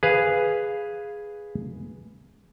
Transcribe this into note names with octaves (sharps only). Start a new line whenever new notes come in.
G#4 B4 F5